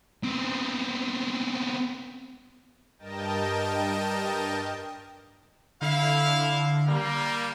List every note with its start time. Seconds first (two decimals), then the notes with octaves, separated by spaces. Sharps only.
0.23 B3 C4
2.98 G2 A#4 D#5 G5 A5
5.82 D3 E4 F5
6.87 G3 A#3